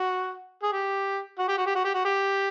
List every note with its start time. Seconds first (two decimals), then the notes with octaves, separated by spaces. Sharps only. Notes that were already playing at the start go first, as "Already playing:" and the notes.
Already playing: F#4
0.63 G#4
0.72 G4
1.39 F#4
1.48 G4
1.58 F#4
1.66 G4
1.75 F#4
1.84 G4
1.94 F#4
2.05 G4